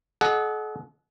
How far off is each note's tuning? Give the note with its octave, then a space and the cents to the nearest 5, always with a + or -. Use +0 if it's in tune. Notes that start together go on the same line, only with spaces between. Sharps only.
A4 -45 D#5 -20 F#5 +0